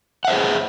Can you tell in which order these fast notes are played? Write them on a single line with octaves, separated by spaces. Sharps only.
F#5 E5 C5 G#4